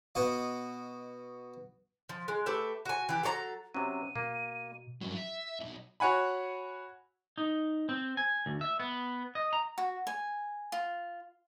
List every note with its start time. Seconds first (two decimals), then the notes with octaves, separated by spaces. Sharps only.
0.15 B2 F#4 D#5
2.09 F3
2.28 G#3
2.46 A3 G4 B4 E5
2.85 F#4 G#5
3.09 E3 G4
3.23 F#3 A4 C5 A#5
3.74 C3 F#3 C#4 D#7
4.16 B2 A#3
5.01 G2 F#3
5.15 E5
5.60 B1 F2
6.00 F#4 C#5 F#5 G#5 B5
7.38 D#4
7.89 C4
8.17 G#5
8.46 D2
8.61 E5
8.80 B3
9.35 D#5
9.53 A#5
9.78 F#4
10.07 G#5
10.72 F4